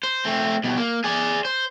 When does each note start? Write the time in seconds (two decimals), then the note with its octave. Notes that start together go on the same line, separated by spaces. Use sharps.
0.03 C5
0.25 A3 C4
0.64 B2 G3
0.78 A#3
1.04 G#4 D5
1.45 C5